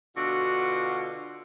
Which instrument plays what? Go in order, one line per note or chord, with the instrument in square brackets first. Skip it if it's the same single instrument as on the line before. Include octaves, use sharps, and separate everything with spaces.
[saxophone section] B2 D3 F4 F#4